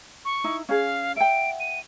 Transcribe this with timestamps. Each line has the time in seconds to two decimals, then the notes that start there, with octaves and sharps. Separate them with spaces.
0.25 C#6
0.44 D#4 E4
0.69 C#4 G#4 F5
1.16 E5 F#5 G5 D7
1.60 D#7